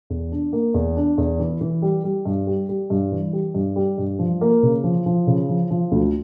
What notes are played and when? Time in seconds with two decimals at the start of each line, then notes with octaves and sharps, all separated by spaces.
0.10 E2
0.32 D4
0.53 A#3
0.74 E2
0.96 D4
1.18 E2
1.40 E3
1.61 E3
1.82 G3
2.04 G3
2.25 G2
2.47 G3
2.69 G3
2.90 G2
3.12 E3
3.33 G3
3.54 G2
3.76 G3
3.98 G2
4.19 F3
4.41 A#3
4.63 C#3
4.84 F3
5.06 F3
5.27 C#3
5.49 F3
5.71 F3
5.92 D2